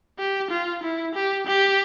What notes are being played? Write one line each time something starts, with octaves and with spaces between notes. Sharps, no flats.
G4
F4
E4
G4
G4